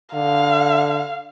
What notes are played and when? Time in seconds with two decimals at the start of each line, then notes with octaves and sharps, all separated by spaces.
0.14 D3 F5